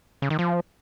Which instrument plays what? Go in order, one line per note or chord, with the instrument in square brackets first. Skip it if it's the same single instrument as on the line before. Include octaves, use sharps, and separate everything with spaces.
[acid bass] C#3
D#3
F3